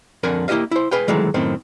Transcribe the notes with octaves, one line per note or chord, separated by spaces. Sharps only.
F2 D3 A#4 F#5 G#5
A#3 E4 G4 D#5 F5
E4 C5
G#4 B4 F5 G5
D#3 E3 F#3 G#3 A3 A4
F#2 A2 D#3 C4